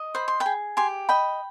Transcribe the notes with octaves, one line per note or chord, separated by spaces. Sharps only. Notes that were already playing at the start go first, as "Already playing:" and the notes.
Already playing: D#5
C5 B5
C6
G5 B5
G#4
G4 G#5 C6
D#5 G5 B5